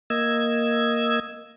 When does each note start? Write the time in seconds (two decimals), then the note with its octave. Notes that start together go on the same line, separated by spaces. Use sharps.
0.10 A#3 D#5 E6 G#6